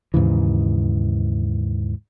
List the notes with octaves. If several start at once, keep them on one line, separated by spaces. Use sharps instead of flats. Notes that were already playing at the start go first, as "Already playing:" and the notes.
D#2 G#2 C#3 E3